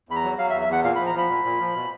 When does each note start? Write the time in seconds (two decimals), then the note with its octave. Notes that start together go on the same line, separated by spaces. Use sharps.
0.09 E2 B5
0.16 A#5
0.24 F#3
0.38 F#3 F5
0.50 E5
0.54 E2
0.61 E5
0.69 E2 F#5
0.84 A#2 F5
0.95 B5
0.99 F3
1.07 A#5
1.15 F3 B5
1.29 A#2
1.45 A#2
1.60 F3
1.75 B2